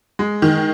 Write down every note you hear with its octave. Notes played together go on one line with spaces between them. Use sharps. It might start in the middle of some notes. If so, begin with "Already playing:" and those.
G#3
D#3